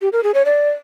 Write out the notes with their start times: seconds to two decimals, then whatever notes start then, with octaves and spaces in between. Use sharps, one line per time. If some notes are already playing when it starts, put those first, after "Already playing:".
0.02 G4
0.12 A#4
0.23 G#4
0.34 C#5
0.45 D5